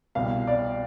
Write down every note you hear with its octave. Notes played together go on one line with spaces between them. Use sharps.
C2 B2 F5
D5